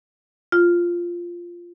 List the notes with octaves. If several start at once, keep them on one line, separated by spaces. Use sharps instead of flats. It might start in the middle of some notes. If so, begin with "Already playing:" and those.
F4